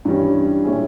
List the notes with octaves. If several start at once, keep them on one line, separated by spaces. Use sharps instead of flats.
G2 E3 G3 C#4
A#2 G#3 C#4 E4 G#4